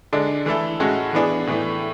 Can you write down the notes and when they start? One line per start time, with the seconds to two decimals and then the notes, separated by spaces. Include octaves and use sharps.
0.13 D3 G#3 D4
0.46 E3 A3 E4 A4
0.80 A2 G#3 C#4 F#4 A4
1.13 E3 B3 D4 G#4
1.47 A2 E3 A3